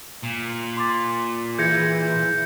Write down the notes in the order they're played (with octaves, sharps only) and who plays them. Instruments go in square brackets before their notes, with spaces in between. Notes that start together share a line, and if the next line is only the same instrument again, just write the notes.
[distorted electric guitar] A#2
[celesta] C6 D6 A6
[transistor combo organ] E3 [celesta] G#4 G#6 A#6 [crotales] G6 C#7